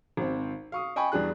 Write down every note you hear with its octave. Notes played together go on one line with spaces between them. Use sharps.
G#1 C4
F5 C#6 D#6
D#5 G5 G#5 B5 C#6
E2 G3 D4 G#4 F#6